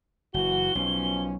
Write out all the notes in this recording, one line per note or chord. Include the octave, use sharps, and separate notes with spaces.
F#1 E3 F#4 G7
B1 B2 F3 C#4